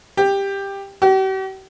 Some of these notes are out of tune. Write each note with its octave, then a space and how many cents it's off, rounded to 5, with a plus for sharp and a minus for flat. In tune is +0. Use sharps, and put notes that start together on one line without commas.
G4 +10
G4 -45